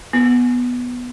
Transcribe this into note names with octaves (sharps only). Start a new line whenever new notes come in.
B3